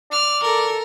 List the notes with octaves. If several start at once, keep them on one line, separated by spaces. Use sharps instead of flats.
D5 F6
A4 A#4